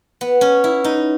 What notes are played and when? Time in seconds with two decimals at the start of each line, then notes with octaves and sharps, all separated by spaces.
0.21 B3
0.41 C#4
0.64 E4
0.84 D#4